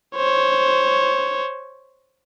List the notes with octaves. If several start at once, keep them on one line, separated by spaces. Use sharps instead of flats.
C5 C#5